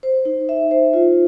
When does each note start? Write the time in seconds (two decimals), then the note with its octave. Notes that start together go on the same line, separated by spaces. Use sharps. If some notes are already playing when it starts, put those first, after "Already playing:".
0.03 C5
0.25 D#4
0.49 E5
0.71 C5
0.94 F4